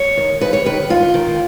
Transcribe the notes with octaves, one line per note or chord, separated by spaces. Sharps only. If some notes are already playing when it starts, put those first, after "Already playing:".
Already playing: C#5
D#3
D#2 B4
C#5
D#3 B4
D#2 F4
D#3